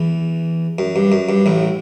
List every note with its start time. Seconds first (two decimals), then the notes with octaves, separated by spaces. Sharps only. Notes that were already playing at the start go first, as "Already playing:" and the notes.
Already playing: E2 E3
0.79 F#2
0.96 G2
1.12 F#2
1.29 G2
1.46 A1 A2